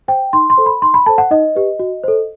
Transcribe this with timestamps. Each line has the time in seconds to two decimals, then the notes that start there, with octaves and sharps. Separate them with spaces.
0.08 C5 G5
0.33 D#4 C6
0.50 C6
0.57 A4 C5
0.66 B5
0.82 D#4 C6
0.94 B5
1.06 A4 C5 A5
1.18 F#5
1.31 D#4 D#5
1.55 G4 B4
1.79 F#4
2.04 A4 C5